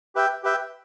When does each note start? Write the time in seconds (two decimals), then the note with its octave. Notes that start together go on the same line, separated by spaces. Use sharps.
0.15 G4 B4 E5 G5
0.43 G4 B4 E5 G5